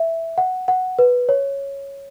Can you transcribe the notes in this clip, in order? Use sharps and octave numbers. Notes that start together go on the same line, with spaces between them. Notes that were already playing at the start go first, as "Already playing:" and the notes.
Already playing: E5
F#5
F#5
B4
C#5